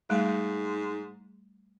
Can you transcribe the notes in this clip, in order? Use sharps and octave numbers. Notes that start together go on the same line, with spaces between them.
G#2 G3 A3